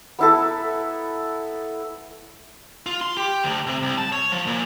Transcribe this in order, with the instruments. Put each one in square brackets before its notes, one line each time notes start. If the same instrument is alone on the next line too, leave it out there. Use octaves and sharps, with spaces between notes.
[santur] B3 E4 A4
[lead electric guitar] F4
C6
G4
D2
C3
C2
A5
C#5
F3
A#2